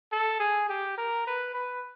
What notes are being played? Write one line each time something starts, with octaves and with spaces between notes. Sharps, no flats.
A4
G#4
G4
A#4
B4
B4